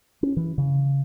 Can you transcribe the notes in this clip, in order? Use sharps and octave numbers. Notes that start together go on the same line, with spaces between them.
C#4
E3
C#3